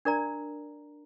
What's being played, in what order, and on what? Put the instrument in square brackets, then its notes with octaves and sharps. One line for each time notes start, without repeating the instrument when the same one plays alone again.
[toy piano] D4 A#4 D5 A#5